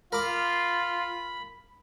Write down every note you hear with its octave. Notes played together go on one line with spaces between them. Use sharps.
F4 A#4 B5 D6